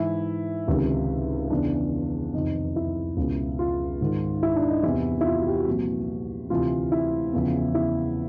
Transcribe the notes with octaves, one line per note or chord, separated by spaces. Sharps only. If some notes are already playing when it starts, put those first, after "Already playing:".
Already playing: G#2 E3 E4
C#2 C3 D#3
E2 C#3 E3 D4
F2 C3 D#3 D#4
E4
C#2 B2
F4
G#2 D#3
E4
D4
D#4
E2 C3 E3 E4
E4
F4
F#4
G4
F#4
C2 A#2 F3
D2 C3 E3 F4
E4
E2 C#3 F3
E4